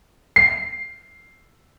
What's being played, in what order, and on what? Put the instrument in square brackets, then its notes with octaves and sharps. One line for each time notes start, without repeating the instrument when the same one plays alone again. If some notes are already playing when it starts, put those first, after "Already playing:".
[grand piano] C7